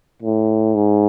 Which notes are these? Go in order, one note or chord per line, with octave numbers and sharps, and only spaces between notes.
A2
G#2